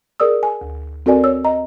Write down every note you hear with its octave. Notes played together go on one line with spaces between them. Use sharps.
G#4 A#4 D5 D#6 E6
G#5
D2
C4 F#4 A4 A#4 D5 G#5
C#5 E6
D#5 A#5